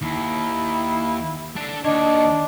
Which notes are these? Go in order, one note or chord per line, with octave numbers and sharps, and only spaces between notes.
D#2 E4
D4 A4
D#2 D4 C#5 D#5